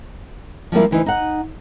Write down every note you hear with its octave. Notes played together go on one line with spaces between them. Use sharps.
F3 G3 A#3 E4
D2 E3 D#4
D#4 F#5